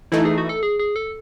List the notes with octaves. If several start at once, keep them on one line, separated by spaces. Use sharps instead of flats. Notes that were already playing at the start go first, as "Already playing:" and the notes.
E3 A3 D#4 E4
G#4
F#4
A4
G#4
G#4
A4